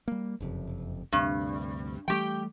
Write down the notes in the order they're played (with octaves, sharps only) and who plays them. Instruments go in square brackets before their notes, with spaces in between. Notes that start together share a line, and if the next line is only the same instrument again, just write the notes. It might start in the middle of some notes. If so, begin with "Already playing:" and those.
[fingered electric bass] G3 A#3
F#1 F2 C3
[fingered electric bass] D2 C3 [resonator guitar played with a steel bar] G2
[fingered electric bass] E3 G3 A3 [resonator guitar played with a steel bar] G4 G5